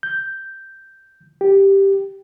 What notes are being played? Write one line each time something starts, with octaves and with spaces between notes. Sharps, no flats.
G6
G4